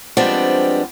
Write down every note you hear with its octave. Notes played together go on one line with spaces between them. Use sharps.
F3 G3 G#3 B3 C4 D4